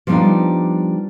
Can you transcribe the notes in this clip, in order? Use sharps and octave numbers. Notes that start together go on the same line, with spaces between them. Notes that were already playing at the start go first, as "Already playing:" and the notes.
F3 G3 B3 C4 D4 D#4